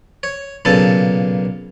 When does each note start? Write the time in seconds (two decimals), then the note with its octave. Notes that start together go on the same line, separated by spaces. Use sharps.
0.23 C#5
0.65 B1 A#2 C#3 B3 A4 A5